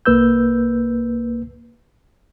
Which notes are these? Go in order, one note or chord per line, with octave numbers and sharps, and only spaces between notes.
C2 A#3 B4 E6 G6